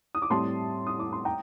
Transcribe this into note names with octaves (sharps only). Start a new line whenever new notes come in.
D#6
D6
A2 G3 C4 A5 C6
D#6
D6
C6
G5 A#5